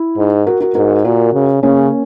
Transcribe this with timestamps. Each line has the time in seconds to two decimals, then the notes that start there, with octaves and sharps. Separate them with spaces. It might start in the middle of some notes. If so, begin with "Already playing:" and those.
Already playing: E4
0.17 G#2
0.47 F#4 A#4
0.60 F#4 A#4
0.75 G#2 F#4 A#4
1.05 A#2 F#4 A#4
1.34 C#3
1.63 C#3 A#3 C#4